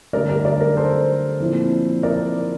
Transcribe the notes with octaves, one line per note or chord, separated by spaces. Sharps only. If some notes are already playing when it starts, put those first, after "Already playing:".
G2 D3 A3 A#4 D5
A#4
A#4 D5
A#4
A4 C5
A#2 F3 C4 E4
A#4 D5